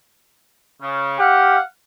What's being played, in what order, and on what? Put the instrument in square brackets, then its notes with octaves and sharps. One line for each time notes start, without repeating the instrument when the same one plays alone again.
[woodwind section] C#3
[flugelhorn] G4 [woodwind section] F5 F#5